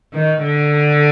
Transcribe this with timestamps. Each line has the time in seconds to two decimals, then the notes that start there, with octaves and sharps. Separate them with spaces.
0.13 D#3
0.43 D3